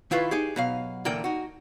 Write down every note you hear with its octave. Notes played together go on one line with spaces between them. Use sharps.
D#3 E4 F4 B4 C#5
D#4 G4 G#4
B2 F#3 F5
A#2 D3 E3 A#4 G5
D#4 F#4